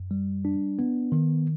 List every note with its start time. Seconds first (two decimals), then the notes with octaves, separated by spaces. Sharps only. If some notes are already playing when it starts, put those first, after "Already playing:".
Already playing: F#2
0.11 G3
0.45 D4
0.79 B3
1.12 D#3